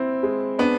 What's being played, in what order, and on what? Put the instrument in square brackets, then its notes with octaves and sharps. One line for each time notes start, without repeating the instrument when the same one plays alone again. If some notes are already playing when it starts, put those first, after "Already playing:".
Already playing: [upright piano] C4 E4
G#3
[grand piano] B3 [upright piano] D4